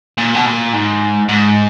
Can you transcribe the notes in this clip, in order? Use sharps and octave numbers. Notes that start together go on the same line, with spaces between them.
A#2
B2
A#2
G#2
G#2